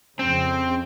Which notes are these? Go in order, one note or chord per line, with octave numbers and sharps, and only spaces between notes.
F2 C#3 C4